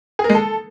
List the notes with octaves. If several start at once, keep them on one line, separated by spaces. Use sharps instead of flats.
G#4
A#4
G#3
A4